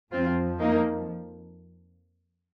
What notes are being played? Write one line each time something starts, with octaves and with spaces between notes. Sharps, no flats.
F2 F3 C4 F4
A#3 D#4